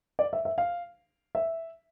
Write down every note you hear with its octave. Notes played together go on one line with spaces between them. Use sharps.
D5
E5
E5
F5
E5